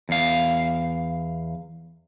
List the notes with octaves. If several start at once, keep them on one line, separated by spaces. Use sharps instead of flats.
E2 F5